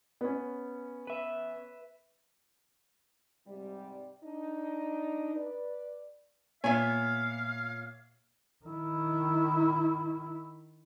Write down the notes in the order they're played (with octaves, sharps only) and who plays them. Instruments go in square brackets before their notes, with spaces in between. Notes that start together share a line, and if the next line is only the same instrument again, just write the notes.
[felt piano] B3 C#4
[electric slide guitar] B4 E5
[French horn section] G#2 C3 G3
D4 D#4
B4 D5
[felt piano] A#2 [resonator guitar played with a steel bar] B3 G#5 [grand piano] C#5 E5 [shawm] F5
[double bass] D#3 E4